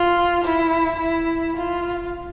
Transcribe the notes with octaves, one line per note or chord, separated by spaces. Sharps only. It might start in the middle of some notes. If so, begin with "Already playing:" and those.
Already playing: F4
E4
E4
F4